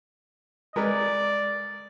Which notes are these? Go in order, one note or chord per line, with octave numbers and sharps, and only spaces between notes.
G#3 A#4 B4 D5